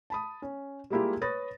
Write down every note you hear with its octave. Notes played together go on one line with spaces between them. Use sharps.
A5 B5 D#6
C#4
G3 G#3 A#3 E4 F4 G4
B4 C#5 B5 D#6 A6 A#6